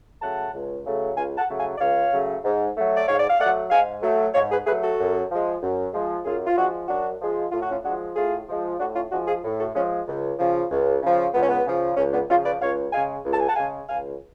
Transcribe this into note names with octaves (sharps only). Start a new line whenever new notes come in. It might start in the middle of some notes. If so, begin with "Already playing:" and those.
C#3 F#3 A3 F#5 A5
C#2
C#3 F#3 A3
C#2 F5 G#5
F#5 A5
C#3 F#3 A3
F5 G#5
D5
C#2 C#5 F5
C#3 F#3 A3
G#2
F#3 A3
D5
G#2 C#5 F5
D5
F5
F#3 A3 D5 F#5
G#2 F5 G#5
F#3 A3
G#2 C#5 F5
G#4 B4
F#3 A3 G#4 B4
F#4 A4
F#2
F3 G#3
F#2
F3 G#3
F#2 F4 G#4
F4
F3 G#3 D4 F#4
F#2 D4 F#4
F3 G#3
A2 F4
F#4
C#4 F4
F3 G#3 D4 F#4
A2 F4 G#4
F3 G#3
A2 D4 F#4
C#4 F4
F3 G#3 D4 F#4
F4 G#4
A2
F#4 A4
F3 G#3 C#4
C#2
C#3 F3
C#2
C#3 F3
C#2 B3
C#4
B3
C#3 F3
C#2 C#4
B3 D4
C#3 F3 C#4 F4
B4 D5
C#2 C#5 F5
C#3 G#3 F5 G#5
C#2
A5
G#5
F#5 A5
C#3 G#3 F5 G#5
C#2 F5 G#5